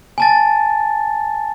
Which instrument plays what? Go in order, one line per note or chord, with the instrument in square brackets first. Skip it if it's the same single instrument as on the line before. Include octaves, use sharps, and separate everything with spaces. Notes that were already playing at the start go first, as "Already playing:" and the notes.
[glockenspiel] G#5 A5 A6